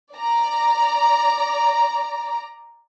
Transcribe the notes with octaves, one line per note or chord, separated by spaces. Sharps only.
D5 A#5